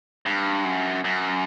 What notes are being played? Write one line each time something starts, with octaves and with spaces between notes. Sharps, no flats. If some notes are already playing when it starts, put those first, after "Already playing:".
G2
F#2
F#2